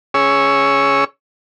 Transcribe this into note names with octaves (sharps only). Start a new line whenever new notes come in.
C#4 G#4 C#5 E6